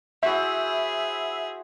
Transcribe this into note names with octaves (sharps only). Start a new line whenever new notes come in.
E4 F#4 G#4 C5 E5